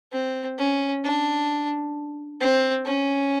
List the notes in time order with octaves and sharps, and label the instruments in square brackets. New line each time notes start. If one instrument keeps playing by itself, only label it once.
[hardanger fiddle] C4
C#4
D4
C4
C#4